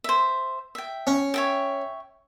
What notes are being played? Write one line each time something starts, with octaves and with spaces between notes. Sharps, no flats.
C5 E5
E5 G5
C#4
C#5 E5 G5